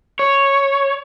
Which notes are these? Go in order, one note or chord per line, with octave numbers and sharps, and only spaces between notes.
C#5